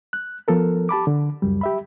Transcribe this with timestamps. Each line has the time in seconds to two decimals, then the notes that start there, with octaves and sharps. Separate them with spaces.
0.13 F#6
0.48 F3 B3 A4 A#4
0.89 G4 A5 B5 D6
1.07 D3
1.42 C#2 F#2 G3
1.61 G4 E5 B5